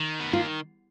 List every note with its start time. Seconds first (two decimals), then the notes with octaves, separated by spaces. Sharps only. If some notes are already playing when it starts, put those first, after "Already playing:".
Already playing: D#3
0.20 B3
0.33 A#3 F4